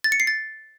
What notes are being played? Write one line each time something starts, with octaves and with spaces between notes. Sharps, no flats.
A6
C#7
C7
A6